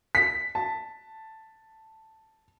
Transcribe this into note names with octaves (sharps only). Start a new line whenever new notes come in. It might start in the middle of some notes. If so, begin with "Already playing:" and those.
B6
A5